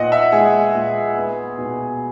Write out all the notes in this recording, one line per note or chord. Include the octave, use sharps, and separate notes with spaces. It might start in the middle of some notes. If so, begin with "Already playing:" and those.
Already playing: A#2 B3 D#5 F#5
E5
G#3 G#4
A#2
B3
B2